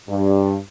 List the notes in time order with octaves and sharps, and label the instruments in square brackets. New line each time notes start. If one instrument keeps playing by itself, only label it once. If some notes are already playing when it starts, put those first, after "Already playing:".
[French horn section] G2